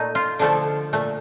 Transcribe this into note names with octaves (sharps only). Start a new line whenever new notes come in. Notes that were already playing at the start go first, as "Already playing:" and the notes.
Already playing: A#2 A3 D#4
F4
D3 F3 A3 A4
A#2 A3